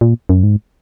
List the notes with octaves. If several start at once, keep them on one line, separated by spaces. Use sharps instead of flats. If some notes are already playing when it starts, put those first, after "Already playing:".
A#2
F#2
G#2